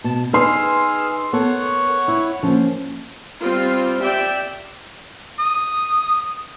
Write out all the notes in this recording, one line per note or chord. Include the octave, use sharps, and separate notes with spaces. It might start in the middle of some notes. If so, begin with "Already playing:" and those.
B2 A5
D#4 G#4 B4 C6 E6 F6
B3 A4 A#4 C#5 F#5 C#6
E4
F3 A#3 C#4
G3 C4 F4
D5 E5 G5
D#6